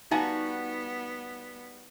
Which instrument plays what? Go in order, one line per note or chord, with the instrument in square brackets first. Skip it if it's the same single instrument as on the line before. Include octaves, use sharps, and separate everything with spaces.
[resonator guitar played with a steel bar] G3 F#4 [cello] B3 [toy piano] D#4 F5 [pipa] F#5 G#5 A#5